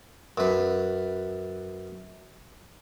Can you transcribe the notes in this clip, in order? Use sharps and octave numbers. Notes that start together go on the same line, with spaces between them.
F#2 B4